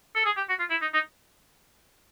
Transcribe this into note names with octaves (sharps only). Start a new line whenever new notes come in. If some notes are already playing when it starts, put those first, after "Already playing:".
A4
G#4
G4
F#4
F4
E4
D#4
D#4